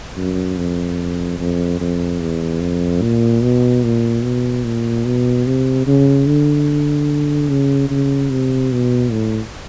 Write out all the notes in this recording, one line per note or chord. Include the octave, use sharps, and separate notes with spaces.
F#2
F2
F2
F2
E2
F2
A#2
B2
A#2
B2
A#2
B2
C3
C#3
D3
C#3
C#3
C3
B2
A2